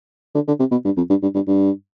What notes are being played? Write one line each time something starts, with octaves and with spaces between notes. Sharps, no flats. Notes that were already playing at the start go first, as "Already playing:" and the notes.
D3
D3
C3
B2
G2
F2
G2
G2
G2
G2